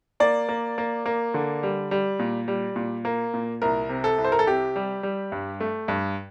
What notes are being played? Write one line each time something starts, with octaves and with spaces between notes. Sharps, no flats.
A#3 D5
A#3
A#3
A#3
D3
G3
G3
A#2
G3
A#2
A#3
A#2
C2 A#4
C3
A4
C2
C5
A#4
A4
C3 G4
G3
G3
G2
A3
G2